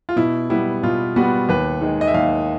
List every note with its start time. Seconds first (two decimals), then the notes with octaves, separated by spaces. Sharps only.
0.09 F4
0.16 B2 E4
0.50 G3 B3 E4
0.83 B2 F4
1.16 G3 B3 F#4
1.49 D#2 B4
1.81 D#3 G#3
2.01 D#5
2.07 E5
2.14 D#2 F5